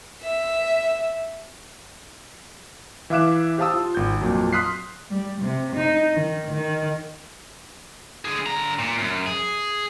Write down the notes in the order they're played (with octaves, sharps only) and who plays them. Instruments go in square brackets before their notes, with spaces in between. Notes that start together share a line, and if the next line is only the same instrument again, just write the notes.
[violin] E5
[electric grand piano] E3 E5 F5 D6 F#6 E7
G4 C5 F5 A5 D#6 E6
F4
G#1 G6
F2 A#2 F#3
C6 D#6 F6 F#6 B6 C7
[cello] G3
C3
D#4
D#3
D#3
[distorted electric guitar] D3 G#4
D3 A#5
A#2
F#2
G#4